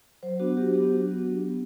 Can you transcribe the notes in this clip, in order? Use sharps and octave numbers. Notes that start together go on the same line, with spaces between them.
F#3 C5
B3 D4 F#4
F#3 G4
B3 D4 G4
F#3 F#4
B3 D4
F#3
B3 D4